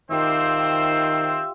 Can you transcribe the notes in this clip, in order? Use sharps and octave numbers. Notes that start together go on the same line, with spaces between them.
D#3 C4 F4 G4 C5 E5